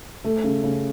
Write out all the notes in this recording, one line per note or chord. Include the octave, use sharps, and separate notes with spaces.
A3
C#3
C#3